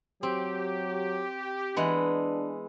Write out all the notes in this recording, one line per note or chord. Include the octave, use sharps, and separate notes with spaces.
F#3 C4 G4
E3 G#3 B3 D4